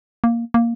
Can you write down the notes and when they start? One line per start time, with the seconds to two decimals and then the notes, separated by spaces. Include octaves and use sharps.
0.24 A#3
0.54 A#3